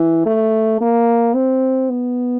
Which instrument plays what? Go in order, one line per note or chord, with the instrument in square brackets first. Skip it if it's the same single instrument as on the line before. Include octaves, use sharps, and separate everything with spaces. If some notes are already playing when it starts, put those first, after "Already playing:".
Already playing: [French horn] E3
A3
A#3
C4
B3